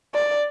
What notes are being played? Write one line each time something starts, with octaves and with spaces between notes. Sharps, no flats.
D5